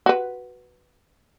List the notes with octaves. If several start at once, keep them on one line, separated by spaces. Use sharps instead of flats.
F#4 B4